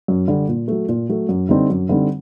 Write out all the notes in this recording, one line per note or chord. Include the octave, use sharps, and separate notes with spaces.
F#2
D3 G3 D4
A#2
F#3 A3
A#2
F#3 A3
F#2
D3 G3 C4 D#4
F#2
D3 G3 C4 D#4